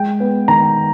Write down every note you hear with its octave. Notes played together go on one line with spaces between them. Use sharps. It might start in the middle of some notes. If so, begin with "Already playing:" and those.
Already playing: G#3 G5
B3
D#3 A#5